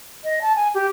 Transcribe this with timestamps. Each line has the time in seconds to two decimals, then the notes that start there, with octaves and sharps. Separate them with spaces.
0.24 D#5
0.42 A5
0.56 G#5
0.75 G4